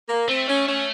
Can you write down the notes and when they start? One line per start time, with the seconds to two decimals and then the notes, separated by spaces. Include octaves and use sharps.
0.09 A#3
0.28 A3 C4
0.48 C#4
0.67 C#4